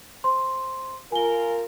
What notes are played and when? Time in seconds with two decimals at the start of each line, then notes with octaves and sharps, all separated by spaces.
0.24 C5 C6
1.12 F4 A#4 G#5 G7